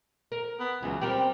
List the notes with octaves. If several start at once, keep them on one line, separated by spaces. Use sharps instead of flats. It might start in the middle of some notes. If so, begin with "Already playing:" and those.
A#4
B3
C#2 E3 F#3
G3 C4 G4 A#4